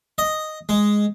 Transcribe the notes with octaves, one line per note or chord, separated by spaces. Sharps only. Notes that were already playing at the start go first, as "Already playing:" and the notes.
D#5
G#3